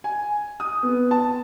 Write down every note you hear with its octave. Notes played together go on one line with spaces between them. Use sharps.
G#5
D#6
B3
A5